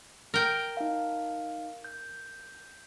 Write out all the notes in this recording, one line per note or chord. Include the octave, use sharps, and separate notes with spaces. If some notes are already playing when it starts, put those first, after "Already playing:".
A#4 G5
D#4 F5
G6